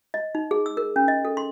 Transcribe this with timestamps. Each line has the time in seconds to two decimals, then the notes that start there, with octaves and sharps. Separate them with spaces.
0.14 D#5
0.35 D#4
0.51 G#4
0.66 E6
0.77 A#4
0.96 C#4
1.08 D#5
1.25 A4
1.37 C6